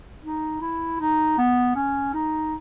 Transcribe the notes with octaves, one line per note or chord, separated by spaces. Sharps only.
D#4
E4
D#4
B3
C#4
D#4